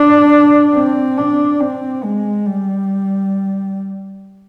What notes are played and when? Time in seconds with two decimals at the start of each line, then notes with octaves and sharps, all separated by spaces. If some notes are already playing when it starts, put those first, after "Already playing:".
Already playing: D4
0.75 C4
1.18 D4
1.60 C4
2.03 G#3
2.46 G3